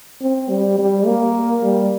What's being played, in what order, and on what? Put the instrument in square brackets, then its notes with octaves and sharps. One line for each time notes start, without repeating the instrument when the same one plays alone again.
[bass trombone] C4
G3
G3
A#3
G3